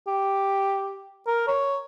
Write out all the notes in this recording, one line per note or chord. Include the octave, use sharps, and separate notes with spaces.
G4
A#4
C#5